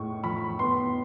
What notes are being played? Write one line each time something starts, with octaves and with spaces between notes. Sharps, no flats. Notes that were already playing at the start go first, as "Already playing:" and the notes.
Already playing: A2 G#3 C#6
F3 B5
B3 C6